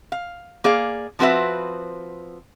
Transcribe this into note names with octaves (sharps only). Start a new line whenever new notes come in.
F5
A#3 G#4 D5 F5
F3 C4 F#4 B4 E5